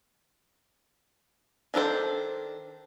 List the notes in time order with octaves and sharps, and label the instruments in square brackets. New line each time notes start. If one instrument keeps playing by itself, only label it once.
[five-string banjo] D#3 D4 A4 C5